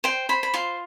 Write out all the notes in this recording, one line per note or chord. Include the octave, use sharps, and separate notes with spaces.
C5 G5
C5 B5
B5
F4 C6